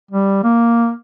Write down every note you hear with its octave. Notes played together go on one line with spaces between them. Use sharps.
G3
A#3